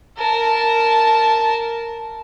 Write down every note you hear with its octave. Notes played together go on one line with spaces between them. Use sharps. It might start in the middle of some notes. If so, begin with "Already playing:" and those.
A#4 A5